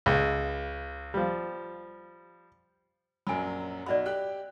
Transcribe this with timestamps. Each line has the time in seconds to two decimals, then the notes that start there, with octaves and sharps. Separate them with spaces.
0.06 C#2
1.14 F3 G3
3.27 A#1 F#2 F#3 G#5 B5
3.86 B1 F#4 D5 D#5 B5
4.05 G4 G5 F#6